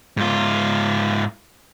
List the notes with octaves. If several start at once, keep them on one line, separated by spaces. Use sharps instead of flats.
G#2 F4